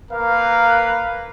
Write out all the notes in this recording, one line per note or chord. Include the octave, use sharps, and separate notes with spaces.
A#3 A#4 B4 F5